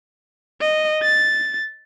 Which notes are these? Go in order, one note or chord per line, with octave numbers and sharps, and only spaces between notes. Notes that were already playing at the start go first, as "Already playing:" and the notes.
D#5
A6